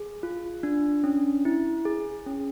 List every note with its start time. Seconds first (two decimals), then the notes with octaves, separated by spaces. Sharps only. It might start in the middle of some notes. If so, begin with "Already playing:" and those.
Already playing: G#4
0.23 F4
0.63 D4
1.04 C#4
1.45 E4
1.85 G#4
2.26 C#4